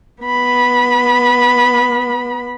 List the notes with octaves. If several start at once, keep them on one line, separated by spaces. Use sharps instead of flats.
B3 B5